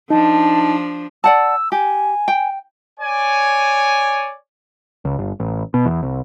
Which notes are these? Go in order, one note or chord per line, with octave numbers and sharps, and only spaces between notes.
F3 D4 D#4 A5
D5 F#5 A5 E6
G4 G#5
G5
C#5 D5 G#5
C#2
G1
A1
B2
E2
C2